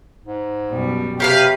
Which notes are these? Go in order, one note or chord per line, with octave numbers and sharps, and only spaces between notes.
G#2
F#2 B2 G3
C3 G4 A#4 B4 C#5 F5